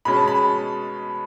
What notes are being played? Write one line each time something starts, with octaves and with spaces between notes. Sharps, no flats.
B2 G#3 C#4 B5
A5
B5